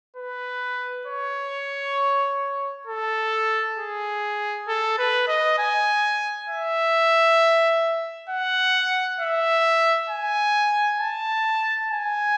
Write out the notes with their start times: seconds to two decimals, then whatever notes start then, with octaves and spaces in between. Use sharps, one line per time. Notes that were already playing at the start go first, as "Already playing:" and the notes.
0.17 B4
1.07 C#5
2.87 A4
3.78 G#4
4.68 A4
4.99 B4
5.28 D#5
5.59 G#5
6.49 E5
8.30 F#5
9.20 E5
10.10 G#5
11.01 A5
11.91 G#5